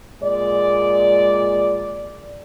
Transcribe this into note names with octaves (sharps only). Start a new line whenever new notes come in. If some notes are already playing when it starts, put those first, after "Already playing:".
A#2 G#3 D5